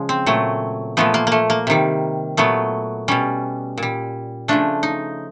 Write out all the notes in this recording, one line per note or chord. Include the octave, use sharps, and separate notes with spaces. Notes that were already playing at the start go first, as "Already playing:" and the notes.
Already playing: C#3 F3 G#3
C4
A#2 F#3 A3
A#2 F3 A3 B3
A#3
A3 A#3
A#3
C3 D#3 G3
A#2 F#3 A3 B3
B2 G3 C#4
A#2 G3
C#3 F3 A3 D4
D#4